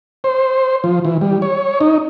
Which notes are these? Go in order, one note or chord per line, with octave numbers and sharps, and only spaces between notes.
C5
F3
E3
G3
C#5
D#4